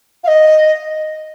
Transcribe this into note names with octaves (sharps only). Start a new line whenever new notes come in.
F5
D#5